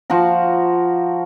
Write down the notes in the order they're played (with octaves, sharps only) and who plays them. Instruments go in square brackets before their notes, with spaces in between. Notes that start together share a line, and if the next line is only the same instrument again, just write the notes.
[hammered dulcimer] F3 F#4 F5 A#5